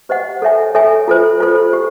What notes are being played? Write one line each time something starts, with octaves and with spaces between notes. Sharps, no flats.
G4 C5 D#5 F#5
A4 C#5 E5 G#5
A4 C#5 E5 G#5
F4 A4 C5
F4 A4 C5
G4